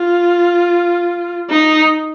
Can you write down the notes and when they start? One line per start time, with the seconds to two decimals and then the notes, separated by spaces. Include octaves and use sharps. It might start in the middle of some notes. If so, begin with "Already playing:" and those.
Already playing: F4
1.50 D#4